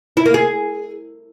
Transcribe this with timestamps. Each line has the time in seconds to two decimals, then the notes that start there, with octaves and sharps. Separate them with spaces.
0.17 E4
0.26 A#3
0.34 G#4